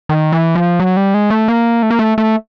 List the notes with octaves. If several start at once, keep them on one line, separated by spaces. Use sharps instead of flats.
D#3
E3
F3
F#3
G3
G#3
A3
A#3
A3
A#3
A3
A3